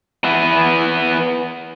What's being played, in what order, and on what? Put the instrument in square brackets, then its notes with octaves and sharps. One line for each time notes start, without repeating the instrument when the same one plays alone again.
[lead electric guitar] E3 B3